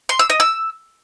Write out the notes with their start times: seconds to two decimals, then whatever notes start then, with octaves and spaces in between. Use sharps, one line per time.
0.09 C6
0.19 E6
0.30 D#5
0.40 E6